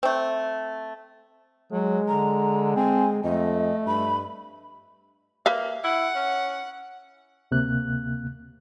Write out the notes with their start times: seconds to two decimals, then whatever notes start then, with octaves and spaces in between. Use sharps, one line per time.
0.03 A3 C4
1.72 F#3 G#3
2.08 D3 A#5
2.76 C4 G#5
3.24 F2 A3 D#5
3.86 G2 B5
5.46 A#3 B4 E5 F5
5.84 E4 F#5
6.16 C#4
7.51 D2 C3 A#3 F#6